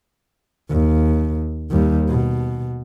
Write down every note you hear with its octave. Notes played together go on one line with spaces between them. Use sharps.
D#2
D#2 G3
B2